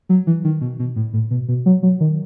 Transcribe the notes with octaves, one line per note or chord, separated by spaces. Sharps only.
F#3
E3
D#3
B2
B2
A2
A2
B2
B2
F#3
F#3
D#3